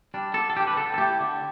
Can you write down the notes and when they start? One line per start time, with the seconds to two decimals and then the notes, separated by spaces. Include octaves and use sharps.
0.14 G3 D4
0.34 D3 A4
0.50 A4
0.57 G3 G4
0.59 D4
0.67 B4
0.77 D3 A4
0.94 A4
0.98 A3 E4 G4
1.20 D3